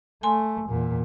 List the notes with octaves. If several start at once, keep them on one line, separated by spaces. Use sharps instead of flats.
A3 G#5 C6
E2 A#2